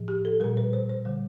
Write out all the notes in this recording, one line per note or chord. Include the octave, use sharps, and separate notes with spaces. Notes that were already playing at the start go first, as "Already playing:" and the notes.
Already playing: A2 F3
G4
A4
A#2 G3 A#4
B4
C5
C5
D3 G3